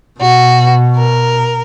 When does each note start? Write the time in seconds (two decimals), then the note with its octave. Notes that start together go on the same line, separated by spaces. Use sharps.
0.20 B2 F#4
0.97 A#4